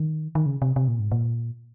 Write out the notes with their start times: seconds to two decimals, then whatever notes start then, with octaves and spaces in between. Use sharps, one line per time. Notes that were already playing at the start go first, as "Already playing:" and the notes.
Already playing: D#3
0.35 D#3
0.46 C#3
0.62 C3
0.76 C3
0.88 A#2
1.00 G#2
1.12 A#2